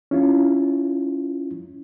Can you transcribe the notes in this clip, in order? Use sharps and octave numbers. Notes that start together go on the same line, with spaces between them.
C#4 E4 F4